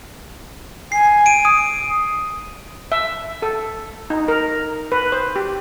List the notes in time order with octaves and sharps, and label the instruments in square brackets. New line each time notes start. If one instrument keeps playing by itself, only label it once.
[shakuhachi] G#5 [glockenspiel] C7
[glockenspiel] D7 D#7
D#6
[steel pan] E5
A4
D#4
A#4
B4
C5
G4